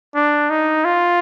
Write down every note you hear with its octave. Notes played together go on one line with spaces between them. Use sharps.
D4
D#4
F4